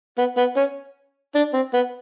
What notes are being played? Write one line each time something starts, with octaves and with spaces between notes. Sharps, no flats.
B3
B3
C#4
D4
C4
B3